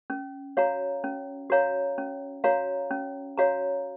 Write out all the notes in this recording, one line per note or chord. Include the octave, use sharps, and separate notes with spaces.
C#4
F#4 C#5 F5 A#5
C#4
F#4 C#5 F5 A#5
C#4
F#4 C#5 F5 A#5
C#4
F#4 C#5 F5 A#5